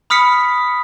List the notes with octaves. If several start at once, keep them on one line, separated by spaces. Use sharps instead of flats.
B5 D#6 F6 B6 C#7